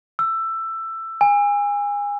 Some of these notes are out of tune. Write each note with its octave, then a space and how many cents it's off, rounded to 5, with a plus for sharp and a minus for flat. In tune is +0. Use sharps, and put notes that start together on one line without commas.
E6 +15
G#5 -25